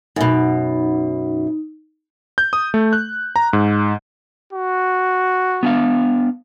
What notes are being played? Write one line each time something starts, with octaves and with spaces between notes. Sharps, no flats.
F#2 B2 D#4
G6
D#6
A3
F#6
A#5
G#2
F#4
B3 D4 F5